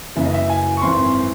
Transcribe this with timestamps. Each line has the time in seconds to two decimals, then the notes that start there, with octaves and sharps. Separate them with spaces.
0.16 F#1 F#2 C#3 E3 E5
0.25 D#5
0.34 E5
0.49 G#5
0.77 C#6
0.82 G#1 F#2 E3 C4 C6